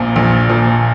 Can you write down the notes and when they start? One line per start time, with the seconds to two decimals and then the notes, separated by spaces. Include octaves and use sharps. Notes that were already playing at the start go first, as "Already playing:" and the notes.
Already playing: A#1 A#2 F3
0.16 A#1
0.49 A#2 F3